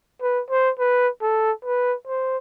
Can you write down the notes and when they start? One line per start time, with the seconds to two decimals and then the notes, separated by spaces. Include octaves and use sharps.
0.22 B4
0.51 C5
0.79 B4
1.22 A4
1.65 B4
2.07 C5